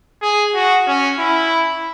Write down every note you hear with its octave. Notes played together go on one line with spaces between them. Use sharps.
G#4
F#4
C#4
E4